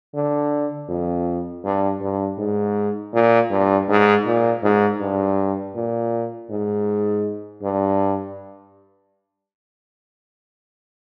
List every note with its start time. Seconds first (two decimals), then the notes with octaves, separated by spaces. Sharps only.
0.14 D3
0.89 F2
1.64 G2
2.01 G2
2.38 G#2
3.14 A#2
3.51 G2
3.89 G#2
4.26 A#2
4.63 G#2
5.00 G2
5.75 A#2
6.50 G#2
7.63 G2